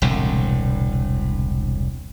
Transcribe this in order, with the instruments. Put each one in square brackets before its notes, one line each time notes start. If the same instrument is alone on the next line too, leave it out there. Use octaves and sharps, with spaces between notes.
[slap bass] E1 C2 A2 D3